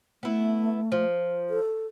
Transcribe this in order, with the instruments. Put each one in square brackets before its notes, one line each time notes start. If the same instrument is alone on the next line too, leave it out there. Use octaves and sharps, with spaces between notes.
[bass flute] A3 [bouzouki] B3 E4
[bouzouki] F3
[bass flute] A4